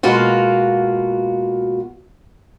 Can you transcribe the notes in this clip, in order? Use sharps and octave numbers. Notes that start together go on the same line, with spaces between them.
B2 G#3 A#3 F4 F#4